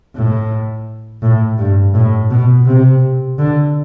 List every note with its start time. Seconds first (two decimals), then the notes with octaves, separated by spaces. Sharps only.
0.16 A2
1.22 A2
1.58 G2
1.94 A2
2.31 B2
2.66 C3
3.38 D3